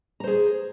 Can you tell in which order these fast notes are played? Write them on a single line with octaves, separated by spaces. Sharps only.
A#5 C5 G#4